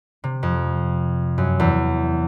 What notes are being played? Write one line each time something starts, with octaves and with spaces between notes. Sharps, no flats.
C3
F2
F#2
E2